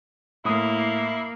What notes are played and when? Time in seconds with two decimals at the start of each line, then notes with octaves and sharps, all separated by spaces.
0.45 A2 A#3 E4 D#6